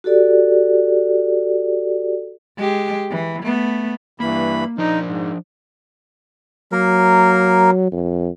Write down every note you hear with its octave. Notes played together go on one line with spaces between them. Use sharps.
F#4 G4 A4 D5
G#3 G4
E3
A3 B3
G2 E3 A#3 B5
F3 D4 D#4 D5
G#2
F#3 A#3 A#4
F2